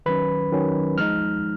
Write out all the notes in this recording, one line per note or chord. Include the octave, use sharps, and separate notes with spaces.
D#3 F#3 C#4 B4 B5
D#3 F#3 C#4
F3 G#3 D#4 F6